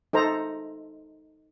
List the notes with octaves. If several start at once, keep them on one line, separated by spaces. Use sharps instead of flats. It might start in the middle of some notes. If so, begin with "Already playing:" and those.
D#4 A4 C5 A#5